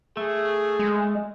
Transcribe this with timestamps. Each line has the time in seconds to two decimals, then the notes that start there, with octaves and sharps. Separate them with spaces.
0.17 A3 G#4
0.79 G#3